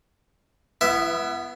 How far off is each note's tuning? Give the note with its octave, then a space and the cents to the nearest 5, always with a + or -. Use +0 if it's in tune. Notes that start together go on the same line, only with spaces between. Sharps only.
B3 +0 E4 +40 E5 +0